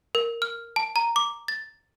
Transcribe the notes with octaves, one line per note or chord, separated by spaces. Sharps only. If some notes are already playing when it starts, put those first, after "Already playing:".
A#4
F6
A5
A#5
D6
A6